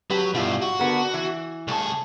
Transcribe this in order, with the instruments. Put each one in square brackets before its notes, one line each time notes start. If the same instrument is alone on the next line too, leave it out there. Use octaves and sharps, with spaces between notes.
[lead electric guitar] F#3 [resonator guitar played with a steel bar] G4 B4
[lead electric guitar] G2 B2 [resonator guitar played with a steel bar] E4 F4 G4
[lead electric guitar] F#4
[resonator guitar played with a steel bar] D3 B3 A#4
E3
[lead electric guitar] C2 G#4 [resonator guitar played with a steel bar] A3